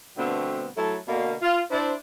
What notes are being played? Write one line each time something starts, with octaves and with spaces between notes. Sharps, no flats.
B2 D3 G3 A3 B3 C4
F#3 A3 E4 A4
B2 D3 A#3
F4
D4 E4 C5